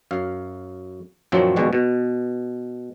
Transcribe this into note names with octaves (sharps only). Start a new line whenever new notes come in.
F#2 F5
F#2 A#2 D#3 F3 F#3 C4
A#1 D#2 B2 G3 G#3 F#4
B2